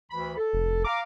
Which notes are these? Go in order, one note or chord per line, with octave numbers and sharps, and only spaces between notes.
D2 E3 B5
A4
F1
F5 A#5 D6